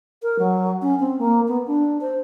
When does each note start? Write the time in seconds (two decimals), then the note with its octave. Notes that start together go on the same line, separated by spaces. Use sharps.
0.23 A#4
0.39 F#3
0.82 C#4
1.00 C4
1.19 A#3
1.48 B3
1.67 D4
2.01 C5